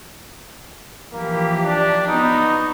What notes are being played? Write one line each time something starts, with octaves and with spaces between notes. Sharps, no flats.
E3 F3 A#3 G4
D4
B3 D#4 F#4